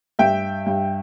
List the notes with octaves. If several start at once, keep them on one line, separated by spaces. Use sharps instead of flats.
G2 E5 G5
G2